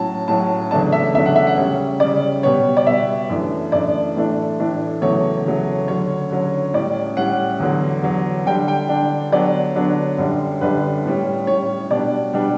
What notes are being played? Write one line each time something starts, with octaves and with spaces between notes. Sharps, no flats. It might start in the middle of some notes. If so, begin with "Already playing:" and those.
Already playing: A2 F#3 C#4 A5
A2 F#3 C#4 A5
E2 C#3 F#3 A3 D4 A5
E5
E2 C#3 F#3 A3 D4 E5
F#5
E5
F#5
C#3 G3 C#4
C#3 G3 C#4 D5
B2 G3 B3 C#5
D5
B2 G3 B3 E5
F#2 E3 A3 D4
F#2 E3 A3 D4 D5
A2 E3 A3 D4
A2 E3 A3 D4
E2 C#3 F#3 A3 C#5
E2 C#3 F#3 A3
D3 F#3 C#4 C#5
D3 F#3 C#4
A2 G3 C#4 D5
A2 G3 C#4 F#5
E2 D3 F#3
E2 D3 F#3
D3 G3 D4 G5
G5
D3 G3 D4
D3 F#3 B3 D4 D5
D3 F#3 B3 D4
F#2 D3 G3 D4
F#2 D3 G3 D4 B4
A2 G3 C#4
A2 G3 C#4 C#5
B2 G3 B3 D4 D5
B2 G3 B3 D4